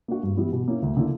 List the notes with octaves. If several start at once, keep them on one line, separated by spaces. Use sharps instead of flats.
A#3 D4 F#4
G2
E3 G3 B3 E4
B2
A#3 C#4 E4
D2
D3 A#3 E4